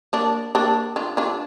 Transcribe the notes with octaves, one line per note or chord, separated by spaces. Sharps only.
A#3 D4
A#3 D4
D4 F4
D4 F4